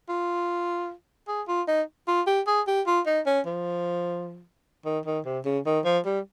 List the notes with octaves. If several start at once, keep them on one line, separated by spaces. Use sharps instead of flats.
F4
G#4
F4
D#4
F4
G4
G#4
G4
F4
D#4
C#4
F3
D#3
D#3
C3
C#3
D#3
F3
G3